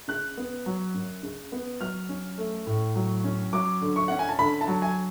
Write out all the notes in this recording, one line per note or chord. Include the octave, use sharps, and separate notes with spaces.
C#3 F#6
B3
F#3
F#2
C#3
B3
F#3 F6
C#4
A3
A2
F#3
C#4
F#3 D6
D3
C#6
C#4 F#5
G#5
A5
D3 B5
A5
F#3
G#5